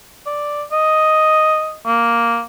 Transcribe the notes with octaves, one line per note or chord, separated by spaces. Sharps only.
D5
D#5
A#3